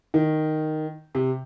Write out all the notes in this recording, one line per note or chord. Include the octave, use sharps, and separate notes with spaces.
D#3
C3